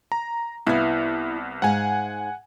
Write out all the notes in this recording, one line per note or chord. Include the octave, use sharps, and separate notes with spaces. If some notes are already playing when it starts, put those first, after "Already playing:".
A#5
C2 B3 E4 F5
G#2 F5 F#5 G#5